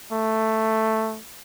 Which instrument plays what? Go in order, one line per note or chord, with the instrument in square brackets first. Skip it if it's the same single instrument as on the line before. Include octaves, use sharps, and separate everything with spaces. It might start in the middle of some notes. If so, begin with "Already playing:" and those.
[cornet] A3